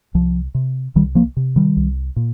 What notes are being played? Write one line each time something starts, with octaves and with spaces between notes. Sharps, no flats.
C2 F3
C3
C2 D#3 G3
F3 A#3
C3
D#3 G3
C2
A#2